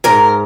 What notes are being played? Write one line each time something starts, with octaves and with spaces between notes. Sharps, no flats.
G#2 A#4